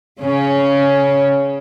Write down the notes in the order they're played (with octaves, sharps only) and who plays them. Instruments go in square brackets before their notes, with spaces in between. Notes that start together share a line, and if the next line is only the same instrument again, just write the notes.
[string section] C#3 C#4